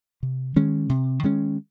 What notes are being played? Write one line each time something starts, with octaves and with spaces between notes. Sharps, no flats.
C3
D#3 G#3 C#4
C3
D#3 G#3 C#4